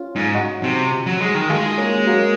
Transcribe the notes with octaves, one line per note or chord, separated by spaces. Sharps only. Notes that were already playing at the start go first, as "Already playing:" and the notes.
Already playing: C#4 F4
G#2
D#4 F#4
C3
F#3
G#3
D#3
G#3 F4 G#4
A#3 C#4
F#3 A#3